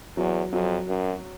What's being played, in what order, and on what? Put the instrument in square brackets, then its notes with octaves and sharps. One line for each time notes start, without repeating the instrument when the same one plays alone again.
[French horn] E2 [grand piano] F#3
[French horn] F2 [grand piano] F#3
[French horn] F#2